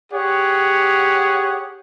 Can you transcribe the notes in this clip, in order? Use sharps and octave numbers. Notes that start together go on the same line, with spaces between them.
G4 G#4 C#5 F#5